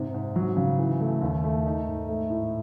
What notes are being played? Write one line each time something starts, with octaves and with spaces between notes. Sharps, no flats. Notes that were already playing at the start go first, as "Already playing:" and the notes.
Already playing: G#2 C3
G#2
F#3
C#3
E3
A3
D#2
A3
D#4
G#2
A3
A2